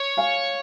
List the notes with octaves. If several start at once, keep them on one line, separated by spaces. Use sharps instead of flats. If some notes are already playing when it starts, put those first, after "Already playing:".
Already playing: C#5
F5 G#5